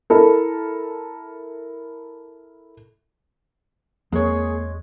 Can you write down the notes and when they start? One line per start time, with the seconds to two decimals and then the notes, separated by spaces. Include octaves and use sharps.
0.10 E4 A4 A#4
4.12 E2 F3 G#3 A#3 C4 G#4 C#5